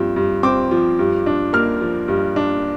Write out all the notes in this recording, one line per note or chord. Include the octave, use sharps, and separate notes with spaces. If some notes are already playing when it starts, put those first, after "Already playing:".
Already playing: G2 F3 C4
G2
C4 D6
F3
G2
D4
A#3 F6
F3
G2
D4